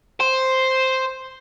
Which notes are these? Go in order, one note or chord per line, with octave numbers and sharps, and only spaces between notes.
C5